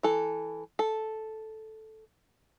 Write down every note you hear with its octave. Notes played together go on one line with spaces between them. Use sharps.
E3 A4
A4